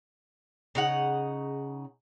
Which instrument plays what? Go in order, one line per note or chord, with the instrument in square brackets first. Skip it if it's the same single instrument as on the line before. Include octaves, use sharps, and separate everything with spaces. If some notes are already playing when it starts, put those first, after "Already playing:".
[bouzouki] C#3 D#4 F#5